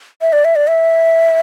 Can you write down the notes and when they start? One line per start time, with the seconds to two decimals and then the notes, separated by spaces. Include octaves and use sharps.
0.21 E5
0.33 D5
0.45 E5
0.56 D5
0.67 E5